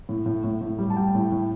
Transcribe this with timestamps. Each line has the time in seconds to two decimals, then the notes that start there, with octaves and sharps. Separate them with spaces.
0.09 A2
0.26 A2
0.44 A2
0.61 A2
0.78 G3
0.90 A5
0.97 G3 G5
1.15 A2
1.32 A2